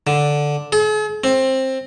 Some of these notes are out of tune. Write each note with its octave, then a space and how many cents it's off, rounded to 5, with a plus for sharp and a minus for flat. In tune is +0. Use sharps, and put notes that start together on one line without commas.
D3 +0
G#4 +45
C4 +15